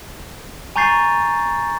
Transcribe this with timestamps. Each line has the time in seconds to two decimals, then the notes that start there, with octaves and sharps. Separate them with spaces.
0.76 G#5 A#5 C#6 G6 A6 C7